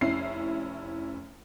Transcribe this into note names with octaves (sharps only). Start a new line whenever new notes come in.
F1 C#4 E4 C7